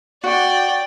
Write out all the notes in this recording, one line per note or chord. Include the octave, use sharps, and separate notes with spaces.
F#4 D5 G5